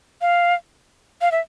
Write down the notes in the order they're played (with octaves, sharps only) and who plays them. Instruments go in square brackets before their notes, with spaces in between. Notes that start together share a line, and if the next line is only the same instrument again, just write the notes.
[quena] F5
F5
E5